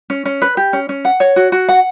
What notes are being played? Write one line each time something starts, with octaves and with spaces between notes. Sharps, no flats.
C#4
C#4
B4
G4
C#4
C#4
F#5
C#5
F#4
F#4
F#5